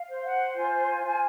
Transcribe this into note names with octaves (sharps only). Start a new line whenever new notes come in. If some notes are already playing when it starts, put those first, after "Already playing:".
Already playing: F5
C5
F#5
F4 G#5
F4